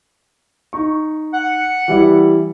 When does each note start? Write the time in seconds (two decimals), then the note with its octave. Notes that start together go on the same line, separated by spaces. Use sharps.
0.73 D#4 C#6
1.33 F#5
1.88 E3 G3 E4